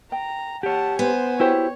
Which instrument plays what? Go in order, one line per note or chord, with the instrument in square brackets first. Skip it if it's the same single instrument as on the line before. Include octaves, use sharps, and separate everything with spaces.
[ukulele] G5 [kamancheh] A#5
[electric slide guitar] G4 C#5 [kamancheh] F#5 A5
[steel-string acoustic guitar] B3 [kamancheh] C5 G#5
[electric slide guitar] E4 [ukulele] F#4 G4 C5 [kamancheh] C#5